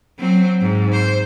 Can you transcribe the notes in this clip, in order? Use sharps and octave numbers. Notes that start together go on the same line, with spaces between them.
F#3 C4
G#2
C5